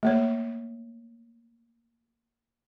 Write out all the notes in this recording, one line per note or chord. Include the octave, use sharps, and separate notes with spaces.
A3 A#3 C#5